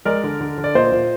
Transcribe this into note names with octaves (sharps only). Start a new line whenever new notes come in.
G#3 A#4 D5
D3
D3
D3
D5
A#2 C5 D#5
A#2